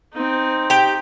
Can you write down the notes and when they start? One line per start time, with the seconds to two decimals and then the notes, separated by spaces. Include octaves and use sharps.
0.14 C4 D#4
0.70 G4 G5